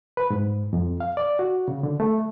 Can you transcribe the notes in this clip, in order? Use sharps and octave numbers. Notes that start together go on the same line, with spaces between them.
B4
G#2
F2
F5
D5
F#4
C#3
D3
A3